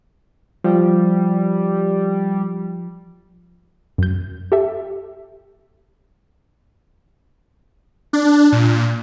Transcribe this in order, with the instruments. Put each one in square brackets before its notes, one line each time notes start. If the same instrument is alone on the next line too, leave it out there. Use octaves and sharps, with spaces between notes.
[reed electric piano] F3 [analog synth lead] G3
[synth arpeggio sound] F#2 G6
G4 A4 E5
[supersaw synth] D4
A#2